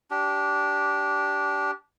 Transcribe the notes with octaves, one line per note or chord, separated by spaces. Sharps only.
D4 G4